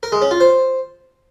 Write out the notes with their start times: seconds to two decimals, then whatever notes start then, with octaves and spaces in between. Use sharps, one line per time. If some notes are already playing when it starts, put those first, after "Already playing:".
0.03 A#4
0.12 G#3
0.22 C#4
0.31 F4
0.40 C5